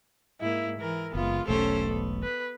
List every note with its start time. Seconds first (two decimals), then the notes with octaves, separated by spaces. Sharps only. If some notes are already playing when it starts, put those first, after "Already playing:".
0.41 G#2 A#3 E4
0.80 E3 A#4
1.15 F#1 G#3 B3 F4
1.48 E1 B1 A3 C#4 G4 A4 C5
1.89 B3
2.22 B4